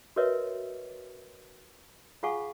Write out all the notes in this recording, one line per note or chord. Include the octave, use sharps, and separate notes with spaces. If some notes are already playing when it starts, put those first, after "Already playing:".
F#4 A#4 B4 C#5 D#5 E5
F4 G#4 F5 F#5 G#5 C#6